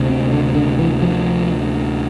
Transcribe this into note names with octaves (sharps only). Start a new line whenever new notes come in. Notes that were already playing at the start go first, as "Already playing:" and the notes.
Already playing: D2 C3
C4
D3
D3
E3
F3